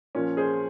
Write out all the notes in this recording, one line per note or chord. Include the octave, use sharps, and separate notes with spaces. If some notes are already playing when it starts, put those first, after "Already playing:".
A#2 F3 C#4
G#4 C5